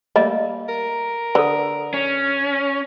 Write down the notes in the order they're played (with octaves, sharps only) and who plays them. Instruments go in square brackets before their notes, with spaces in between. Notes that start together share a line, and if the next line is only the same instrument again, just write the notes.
[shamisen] G3 A3 A#3 [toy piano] D#5
[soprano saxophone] A#4
[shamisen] D3 [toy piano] A4 B4
[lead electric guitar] C#4